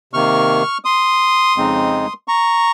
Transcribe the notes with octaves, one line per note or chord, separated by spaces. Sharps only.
C3 D#3 A#3 C#6 F6
C6 D#6
F2 C#3 G#3 C4 D#4
A#5 C#6